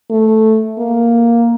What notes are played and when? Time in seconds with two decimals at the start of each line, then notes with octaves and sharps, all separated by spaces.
0.10 A3
0.78 A#3